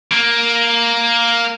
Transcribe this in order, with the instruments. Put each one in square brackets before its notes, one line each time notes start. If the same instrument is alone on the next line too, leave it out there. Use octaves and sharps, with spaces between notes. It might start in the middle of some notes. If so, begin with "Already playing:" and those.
[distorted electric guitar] A#3